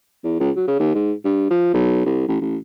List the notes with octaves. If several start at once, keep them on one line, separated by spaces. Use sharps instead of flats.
E2
C#2
F#3
C#3
D#2
G#2
G2
F3
B1
C2
A1
A1